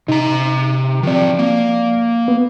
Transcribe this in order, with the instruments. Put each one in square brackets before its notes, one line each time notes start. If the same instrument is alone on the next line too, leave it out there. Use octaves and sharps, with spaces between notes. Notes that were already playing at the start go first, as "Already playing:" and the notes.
[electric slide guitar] C3 A#5 [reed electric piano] D#4
[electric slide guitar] D#3 C4 [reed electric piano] F3 D5
[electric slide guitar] A#3
[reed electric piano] B3